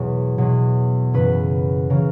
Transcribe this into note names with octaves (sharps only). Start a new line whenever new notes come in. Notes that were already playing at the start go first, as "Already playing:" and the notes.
Already playing: E2 B2 F#3
E2 B2 F#3
F#2 C#3 E3 B4
C#3 E3 A#4